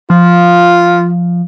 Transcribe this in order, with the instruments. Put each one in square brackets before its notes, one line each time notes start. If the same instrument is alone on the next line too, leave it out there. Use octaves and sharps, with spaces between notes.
[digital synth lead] F3 [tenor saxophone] F4